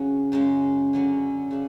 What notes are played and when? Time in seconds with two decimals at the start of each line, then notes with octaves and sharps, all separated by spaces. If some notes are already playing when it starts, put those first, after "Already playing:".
Already playing: C#3 F#3 C#4 F#4
0.32 F#2 C#3 G#3
0.93 D3 F#3 C#4
1.51 C#3 D4